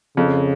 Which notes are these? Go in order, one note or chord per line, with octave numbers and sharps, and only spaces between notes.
F2 C#3